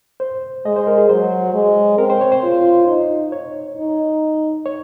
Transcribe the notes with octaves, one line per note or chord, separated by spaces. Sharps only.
C5
G#3 D#5
C5
A#4
G#4
F#3 C5
G#3
C4 A#4
C5
C#5
C5
F4
D#4
C#5
D#4
C#5